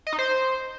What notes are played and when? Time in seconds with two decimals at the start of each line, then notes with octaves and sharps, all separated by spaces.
0.07 D#5
0.13 D#4
0.19 C5